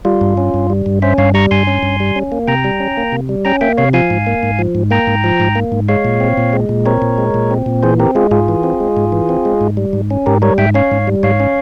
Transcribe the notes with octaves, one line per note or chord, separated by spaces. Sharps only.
G3 F4
G2
C#4
G2
G3
G2
C#4 C5 E5
G2 C#5 F5
G3 A#5 C#6
G2 G#5 C6
C#4
G2
G3
C#4
A#3
C3 G5 A#5
G3
C#4
A#3
C3
G3
C#4 G5 A#5
A#3 E5 G5
C3 C#5 F5
F3 F5 G#5
G#2
A#3
G#2
F3
G#2
A#3 G5 A#5
G#2
F3
G#2
A#3
G#2
G#3 C#5 F5
A#2
C4
A#2
G#3
A#2
C4 A#4 C#5
A#2
G#3
A#2
C4
A#2
E3 G#4 C5
C4 G4 A#4
G#3 F4 G#4
G#2 F4 G#4
E3
C4
G#3
G#2
E3
C4
G#3
G#2
G3
G#2
C#4
G#2 G4 A#4
G3 A#4 C#5
G#2 E5 G5
C#4 C#5 F5
G#2
G3
G#2 C#5 F5
C#4